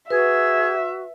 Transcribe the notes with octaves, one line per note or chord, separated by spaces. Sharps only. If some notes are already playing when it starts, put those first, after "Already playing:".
F#4 G#4 B4 E5